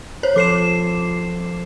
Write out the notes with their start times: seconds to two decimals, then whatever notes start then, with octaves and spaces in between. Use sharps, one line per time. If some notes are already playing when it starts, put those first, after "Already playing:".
0.23 C5 C#5
0.36 F3 A4 C5 D6 C7 E7